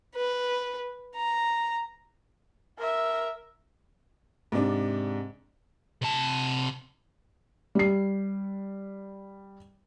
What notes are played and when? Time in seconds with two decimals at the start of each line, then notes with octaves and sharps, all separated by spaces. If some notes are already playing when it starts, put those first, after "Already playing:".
0.16 B4
1.16 A#5
2.78 A#4 E5
4.52 G#2 C3 D4
6.02 C3 A5
7.75 G3 C7